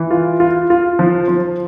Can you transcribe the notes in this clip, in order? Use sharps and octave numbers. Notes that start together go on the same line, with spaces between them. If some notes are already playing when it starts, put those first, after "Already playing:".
Already playing: E3
F4
F4
F4
F3
F3